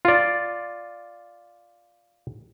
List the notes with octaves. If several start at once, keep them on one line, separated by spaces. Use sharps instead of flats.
F4 D5